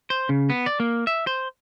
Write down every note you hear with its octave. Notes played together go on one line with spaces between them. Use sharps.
C5
C#3
B3
D5
A#3
E5
C5